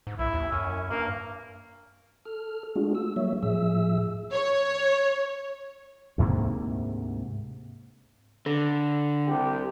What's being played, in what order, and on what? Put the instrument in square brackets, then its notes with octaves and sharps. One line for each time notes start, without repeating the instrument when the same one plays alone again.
[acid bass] G#2
[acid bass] B1 [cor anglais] E4
[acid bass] D#2
[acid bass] F#2 [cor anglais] C#4
[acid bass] G2 [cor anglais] A#3
[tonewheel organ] A4 F6
G#3 A3 D4 F4 F#4 G#4
E6
F#3 G3 A#3 C#5 E5
A2 F3 G#4 E5 E6
[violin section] C#5
[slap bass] D2 G#2 C3 A#3
[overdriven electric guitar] D3 [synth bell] A4
[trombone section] C2 G4